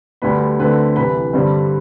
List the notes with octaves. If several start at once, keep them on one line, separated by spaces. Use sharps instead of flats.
D2 D3 G3 B4 B5
D2 D3 A3 C4 B4 B5
C2 C3 E3 B4 B5
G2 D3 G3 C4